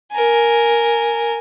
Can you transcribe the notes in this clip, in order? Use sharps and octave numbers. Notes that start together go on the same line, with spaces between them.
A#4 G#5